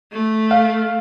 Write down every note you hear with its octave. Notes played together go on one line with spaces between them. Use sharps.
A3
F5